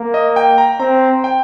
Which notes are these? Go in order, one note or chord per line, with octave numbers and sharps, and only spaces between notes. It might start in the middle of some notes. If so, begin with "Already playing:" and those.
Already playing: A#3
D#5
G5
A#5
C4 A#5
G5